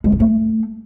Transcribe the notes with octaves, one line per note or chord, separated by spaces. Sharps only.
G#3
D#4
A3